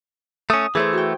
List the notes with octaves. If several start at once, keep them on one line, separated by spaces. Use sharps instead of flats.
A3 C#4 D#6
E3 A3 G#4 C5
F#4 G5